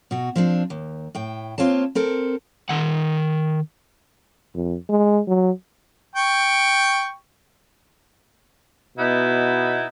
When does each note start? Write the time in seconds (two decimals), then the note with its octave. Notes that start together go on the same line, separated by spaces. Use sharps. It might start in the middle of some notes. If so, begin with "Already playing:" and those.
0.11 B2 F#4
0.36 F3 C4 D4
0.70 D#2
1.15 A2 G5
1.58 A#3 C4 F4 C#5 A5
1.95 C4 A4 A#4
2.69 D#3 F#5
4.54 F2
4.89 G#3
5.28 F#3
6.16 G5 C#6
8.98 B2 B3 D#4 E4